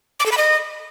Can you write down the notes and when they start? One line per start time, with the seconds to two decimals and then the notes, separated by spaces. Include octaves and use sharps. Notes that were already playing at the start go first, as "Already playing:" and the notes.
0.20 D6
0.26 A4
0.32 B5
0.38 D#5